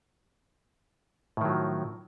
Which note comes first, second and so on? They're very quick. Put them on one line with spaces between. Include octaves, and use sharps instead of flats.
A2 D#3 F#3 F3